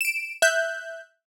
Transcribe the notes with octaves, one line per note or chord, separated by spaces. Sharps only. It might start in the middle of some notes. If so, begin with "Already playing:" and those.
D7 E7
E5 F#6 G6